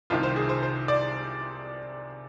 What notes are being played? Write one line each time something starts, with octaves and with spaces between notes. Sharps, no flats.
C2 C3 D#3 F4
C5
G#4
C5
C5
D5